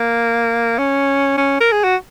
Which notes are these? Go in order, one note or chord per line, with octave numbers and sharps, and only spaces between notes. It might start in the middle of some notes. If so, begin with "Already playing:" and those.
Already playing: A#3
C#4
C#4
A#4
G#4
F#4